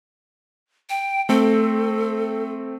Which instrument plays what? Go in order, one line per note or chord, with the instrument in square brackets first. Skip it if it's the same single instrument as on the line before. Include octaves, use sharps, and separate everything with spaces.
[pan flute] G5
[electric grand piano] A3 C4 [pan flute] A4